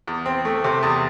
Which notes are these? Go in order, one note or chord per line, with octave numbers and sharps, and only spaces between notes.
E2
C4
A3
C3
E2